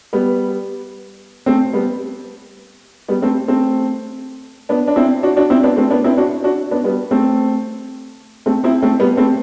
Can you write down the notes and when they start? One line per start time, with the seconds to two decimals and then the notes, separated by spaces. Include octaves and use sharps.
0.13 G3 B3
1.46 A3 C4
1.73 G3 B3
3.08 G3 B3
3.22 A3 C4
3.48 A3 C4
4.69 B3 D4
4.88 D4
4.96 C4 E4
5.23 D4 F#4
5.37 D4 F#4
5.50 C4 E4
5.63 B3 D4
5.77 A3 C4
5.90 B3 D4
6.04 C4 E4
6.18 D4 F#4
6.44 D4 F#4
6.71 B3 D4
6.84 G3 B3
7.11 A3 C4
8.46 A3 C4
8.64 C4 E4
8.82 A3 C4
9.00 G3 B3
9.17 A3 C4